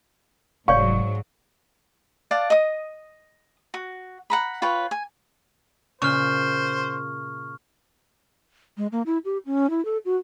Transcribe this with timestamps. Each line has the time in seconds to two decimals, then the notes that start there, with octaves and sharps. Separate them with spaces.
0.68 F1 G#2 F#3 C#5 D5 F5 C#6
2.31 D5 F5 F#5 A5
2.50 D#5 D#6
3.74 F#4
4.30 F#5 A#5 B5
4.62 F4 B4 C#5 G5
4.91 G#5
6.02 A#2 C#3 C5 C#6 F6
8.77 G#3
8.92 A#3
9.06 E4
9.25 G4
9.46 C#4
9.70 E4
9.85 A4
10.05 F#4